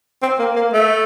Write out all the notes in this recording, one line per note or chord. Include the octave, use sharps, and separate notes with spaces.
C4
A#3
A#3
A3